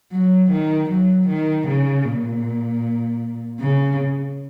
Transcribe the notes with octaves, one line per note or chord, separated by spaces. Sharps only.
F#3
D#3
F#3
D#3
C#3
A#2
C#3